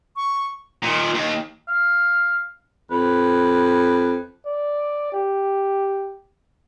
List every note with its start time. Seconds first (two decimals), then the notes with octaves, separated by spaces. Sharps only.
0.16 C#6
0.83 A#2 D#3
1.15 D#2
1.68 F5
2.91 F2 B4
4.46 D5
5.13 G4